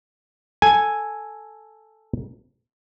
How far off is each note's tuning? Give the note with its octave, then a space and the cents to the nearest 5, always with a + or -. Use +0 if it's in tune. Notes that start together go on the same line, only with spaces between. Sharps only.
A4 +0 G#5 +0